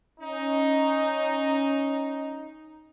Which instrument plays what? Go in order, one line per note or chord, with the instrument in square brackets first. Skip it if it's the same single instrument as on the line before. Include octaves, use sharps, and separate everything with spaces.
[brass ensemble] C#4 D#4